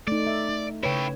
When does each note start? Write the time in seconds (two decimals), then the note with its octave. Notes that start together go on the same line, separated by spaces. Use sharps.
0.07 A3 D#4 D5
0.27 E5
0.49 D#4
0.83 C#3 E4 B4 C#5 G5